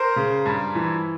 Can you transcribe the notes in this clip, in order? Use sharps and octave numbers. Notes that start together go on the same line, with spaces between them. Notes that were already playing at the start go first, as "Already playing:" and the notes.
Already playing: A#4 C5
C#3
G2
E3